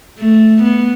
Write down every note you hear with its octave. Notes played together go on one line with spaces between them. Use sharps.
A3
B3